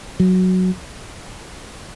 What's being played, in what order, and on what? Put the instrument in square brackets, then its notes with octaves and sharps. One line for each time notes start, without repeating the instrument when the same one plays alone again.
[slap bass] F#3